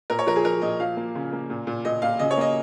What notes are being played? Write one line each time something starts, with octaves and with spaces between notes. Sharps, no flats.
A#2 A#4
C#5
F3 A#4
G#4
F3 A#4
A#2 D#5
F3 F5
A#3
C#3
A#3
A#2
A#2
A#2 D#5
A#2 F5
C#3 D#5
C#5
A#3 D#5